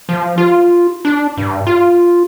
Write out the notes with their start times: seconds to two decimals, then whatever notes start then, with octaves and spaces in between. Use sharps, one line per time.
0.09 F3
0.38 F4
1.05 D4
1.38 G2
1.67 F4